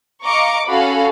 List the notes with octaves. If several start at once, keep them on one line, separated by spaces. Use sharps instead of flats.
D#5 F5 A#5 C#6 D6 C#7
C#4 F#4 A4 F5 B5